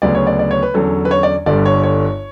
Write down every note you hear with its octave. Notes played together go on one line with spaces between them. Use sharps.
D2 C#3 F#3 B3 D5
C#5
D5
D5
C#5
B4
E2 D3 F#3 C#4 A4
B4
C#5
D5
G1 G2 D3 G3 D5
C#5
C#5